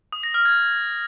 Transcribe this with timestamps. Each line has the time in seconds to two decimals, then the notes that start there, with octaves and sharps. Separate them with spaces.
0.12 D#6
0.23 A#6
0.34 F6
0.45 G#6